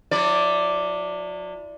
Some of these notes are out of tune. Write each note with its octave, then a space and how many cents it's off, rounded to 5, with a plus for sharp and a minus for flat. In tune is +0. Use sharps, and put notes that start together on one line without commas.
F#3 -40 E4 +0 D5 +0